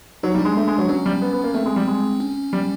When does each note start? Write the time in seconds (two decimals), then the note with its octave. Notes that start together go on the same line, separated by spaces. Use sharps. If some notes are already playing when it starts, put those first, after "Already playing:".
0.23 F#3 D#4
0.35 G3
0.39 D4
0.45 G#3
0.57 A3
0.68 G#3
0.78 F#3
0.89 F#3 C#4
1.06 G3
1.22 B3
1.33 B3
1.44 A#3
1.54 A3 C4
1.66 G#3
1.76 G3
1.87 G#3
2.20 C#4
2.53 G3